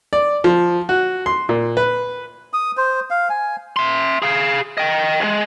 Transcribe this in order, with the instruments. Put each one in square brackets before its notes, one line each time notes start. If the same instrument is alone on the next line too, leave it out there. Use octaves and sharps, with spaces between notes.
[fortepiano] D5
F3
F#4
C6
A#2
B4
[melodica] D#6
C5
F5
G#5
[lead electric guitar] E5 C6
G#4 F5
D#5 G5
D#2 G#3